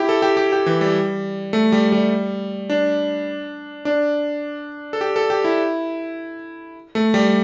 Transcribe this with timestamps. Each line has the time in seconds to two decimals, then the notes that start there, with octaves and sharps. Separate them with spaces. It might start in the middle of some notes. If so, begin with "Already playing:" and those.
Already playing: E4 G4
0.09 A4
0.22 G4
0.37 G4
0.52 G4
0.66 E3
0.81 G3
1.53 A3
1.72 G3
1.92 G3
2.70 D4
3.85 D4
4.93 A4
5.01 G4
5.16 A4
5.30 G4
5.44 E4
6.95 A3
7.14 G3